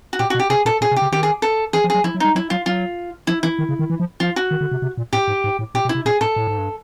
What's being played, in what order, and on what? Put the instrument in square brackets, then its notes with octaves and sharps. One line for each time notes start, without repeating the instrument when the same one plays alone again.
[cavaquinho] F#4
[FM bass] A#2 [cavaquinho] G4
[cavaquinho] F#4
[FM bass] B2
[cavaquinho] G4
[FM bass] C3 [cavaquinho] G#4
[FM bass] A#2 [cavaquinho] A4
[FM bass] A#2 [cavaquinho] G#4
[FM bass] C3
[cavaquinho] G4
[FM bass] C#3
[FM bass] D#3 [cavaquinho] G4
[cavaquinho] G#4
A4
[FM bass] E3 [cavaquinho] G#4
[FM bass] F3
[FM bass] F#3 [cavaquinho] G#4
[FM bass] F3 [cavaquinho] E4
[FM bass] F#3
[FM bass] G3 [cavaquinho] D#4
[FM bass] F#3 [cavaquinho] E4
[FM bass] F#3 [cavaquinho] F4
[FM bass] F#3 [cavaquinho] F4
[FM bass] F3 [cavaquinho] E4
[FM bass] E3 [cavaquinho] E4
[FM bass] D#3
C#3
D#3
E3
F3
[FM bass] F3 [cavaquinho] F4
[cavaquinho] F#4
[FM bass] D#3
D3
C3
C3
A#2
[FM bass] A2 [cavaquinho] G4
[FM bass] G#2
G#2
A2
[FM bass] A#2 [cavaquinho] G4
[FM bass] B2
[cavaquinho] E4
[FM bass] C3
[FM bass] A#2 [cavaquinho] G#4
[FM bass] A2 [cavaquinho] A4
[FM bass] A2
G#2
G2